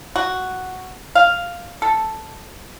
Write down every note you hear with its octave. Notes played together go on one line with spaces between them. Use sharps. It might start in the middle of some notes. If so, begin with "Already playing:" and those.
F#4
F5
A4